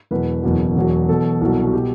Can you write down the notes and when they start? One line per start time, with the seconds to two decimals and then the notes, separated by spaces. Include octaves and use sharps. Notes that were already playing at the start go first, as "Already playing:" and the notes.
0.11 E1 E2 B2 F#3 B4
0.43 F#1 E2 B2 F#3
0.76 E1 E2 B2 F#3
1.09 E2 B2 F#3 A4
1.41 C2 B2 F#3
1.67 F#4
1.73 B2 G3 G4